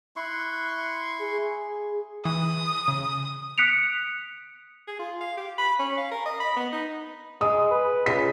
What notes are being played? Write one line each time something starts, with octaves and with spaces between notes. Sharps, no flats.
E4 C6 C#6 F#6
G#4
E3 D#6
C#3
D#6 F#6 B6 C#7 D7 F7
G#4
F4
F5
G4
B5
C#4
F5
A#4
D#5
B5
B3
D#4
G#3 D#6
B4
C#2 B6